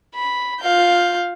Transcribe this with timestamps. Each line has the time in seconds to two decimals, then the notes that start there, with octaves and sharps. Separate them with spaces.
0.15 B5
0.60 F4 F5 G6